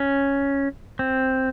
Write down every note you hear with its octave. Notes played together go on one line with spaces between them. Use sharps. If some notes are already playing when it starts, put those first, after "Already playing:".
Already playing: C#4
C4